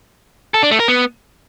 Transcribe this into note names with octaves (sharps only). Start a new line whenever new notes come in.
A4
D4
A3
A#4
B3